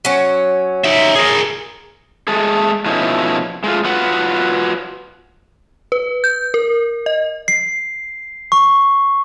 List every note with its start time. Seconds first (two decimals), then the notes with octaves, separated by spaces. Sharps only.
0.05 F#3 C#4
0.84 D#4 E5
1.15 G#4 A#4
2.28 G#3 A3 G#4 A4
2.85 B2 F3 A3 C#4 D#4 E4
3.64 G#3 A3 F4
3.84 F#3 F4 B4 F#5
5.92 B4
6.24 G6
6.54 A#4
7.06 D#5
7.48 C7
8.52 C#6